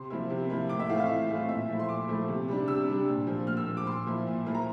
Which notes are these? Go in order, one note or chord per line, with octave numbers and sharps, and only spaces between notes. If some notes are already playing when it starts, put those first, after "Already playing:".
Already playing: C3 C6
F3 A#3 E4
C3
F3 A#3 E4
A2 D6
E5
E3 A3 C4 F4 F5
F5
A2 E5
E3 A3 C4 F4
A#2 E5
F3 A3 E4
C6
A#2 D6
F3 A3 E4
C3
G3 D4
C3 E6
G3 D4
A#2
F3 A#3
A#2 F6
E6
F3 A#3
D6
A#2 C6
F3 A#3 E4
A#2
F3 A#3 E4
A#5